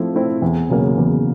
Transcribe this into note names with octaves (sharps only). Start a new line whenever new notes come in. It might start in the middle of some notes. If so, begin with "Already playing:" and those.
Already playing: F3 A3 C4 E4
A3 C4 E4
E2
C#3 F#3 A#3
E2